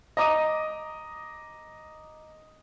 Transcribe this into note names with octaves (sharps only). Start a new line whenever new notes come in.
D#5 A#5 D6 D#6 D#7